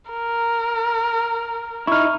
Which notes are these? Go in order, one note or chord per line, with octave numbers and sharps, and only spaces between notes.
A#4
D#4 E4 C#6 F6